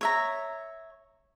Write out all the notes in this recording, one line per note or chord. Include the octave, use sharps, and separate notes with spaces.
C#5 E5 A#5